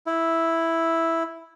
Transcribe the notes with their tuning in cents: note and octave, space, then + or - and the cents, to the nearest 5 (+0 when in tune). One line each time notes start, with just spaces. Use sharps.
E4 +0